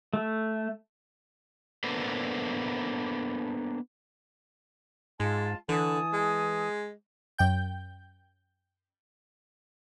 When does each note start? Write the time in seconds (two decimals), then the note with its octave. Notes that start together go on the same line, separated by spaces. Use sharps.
0.14 A3
1.84 A#3 B3 D4 A4 B4 C5
5.20 G#2 G#3 F4 A5
5.69 D3 E3 G#5 A5 D#6
6.13 G#3
7.38 F#2 G5 G6